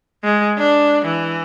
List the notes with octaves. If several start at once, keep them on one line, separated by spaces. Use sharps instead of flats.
G#3
D4
E3